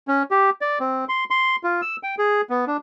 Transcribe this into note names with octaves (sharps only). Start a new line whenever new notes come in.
C#4
G4
D5
C4
C6
C6
F4
E6
G5
G#4
B3
D4